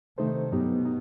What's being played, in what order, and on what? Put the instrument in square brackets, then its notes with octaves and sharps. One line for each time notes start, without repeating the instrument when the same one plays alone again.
[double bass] C3 [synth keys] D#3 A3 D#4 A4 C5
[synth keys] G2 F#3 B3 D#4 G4 [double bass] B2
[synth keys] D#4